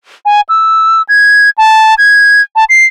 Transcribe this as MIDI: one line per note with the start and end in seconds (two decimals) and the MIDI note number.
0.25 0.41 80
0.49 1.02 88
1.09 1.50 92
1.58 1.95 81
1.98 2.42 92
2.56 2.65 81
2.69 2.86 96